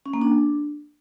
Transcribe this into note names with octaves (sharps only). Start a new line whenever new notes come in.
C#4
A#3
D4